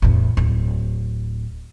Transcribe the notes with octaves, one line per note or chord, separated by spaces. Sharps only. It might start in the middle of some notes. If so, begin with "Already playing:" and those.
E2 A2
D1